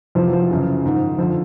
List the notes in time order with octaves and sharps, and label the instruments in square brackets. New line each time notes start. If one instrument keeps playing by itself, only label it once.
[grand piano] F2 C3 E3 F3
F#3
F3
F#2 C#3 E3
G#2 D#3
F2 D3 F3